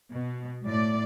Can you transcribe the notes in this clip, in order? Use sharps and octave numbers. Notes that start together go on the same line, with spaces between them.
B2
A2 D5